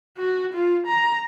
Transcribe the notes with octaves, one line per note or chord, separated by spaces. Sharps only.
F#4
F4
A#5